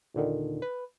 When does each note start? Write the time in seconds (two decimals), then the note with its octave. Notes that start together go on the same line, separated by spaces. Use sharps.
0.14 D#2 A#2 D3 D#3
0.62 B4